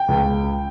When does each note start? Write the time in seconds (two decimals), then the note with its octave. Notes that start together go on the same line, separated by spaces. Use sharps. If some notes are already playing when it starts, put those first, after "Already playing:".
Already playing: G5
0.08 C#2